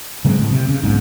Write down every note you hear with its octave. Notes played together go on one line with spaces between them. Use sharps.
C#3 F#3 G#3 C4
A2
C3
C#3
E1 B1 G#2